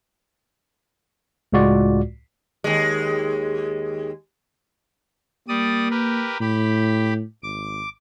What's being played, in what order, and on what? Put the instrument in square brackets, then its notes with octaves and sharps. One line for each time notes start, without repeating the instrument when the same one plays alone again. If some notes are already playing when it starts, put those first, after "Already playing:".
[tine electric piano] C#2 A2 G#3 F4 F#4 D5
[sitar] D#2 G#3
[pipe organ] G3 D5 D#6 [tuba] A#3
[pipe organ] G4 A#4 B4
[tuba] A2 [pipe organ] G4 B5
[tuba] G#1 [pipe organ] D6